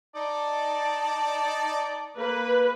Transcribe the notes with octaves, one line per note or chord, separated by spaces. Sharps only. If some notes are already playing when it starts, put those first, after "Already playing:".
D#4 D5 A5
A#3 B4